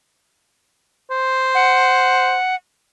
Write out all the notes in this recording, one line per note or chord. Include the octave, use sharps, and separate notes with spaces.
C5
F#5